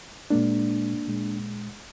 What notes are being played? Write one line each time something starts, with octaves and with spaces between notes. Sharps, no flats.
A#2 G#3 A#3 D4
A#2 G#3